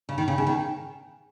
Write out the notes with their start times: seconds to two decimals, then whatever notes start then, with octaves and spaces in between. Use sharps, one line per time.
0.09 C#3
0.18 D#3
0.28 C#3
0.38 C#3
0.47 D#3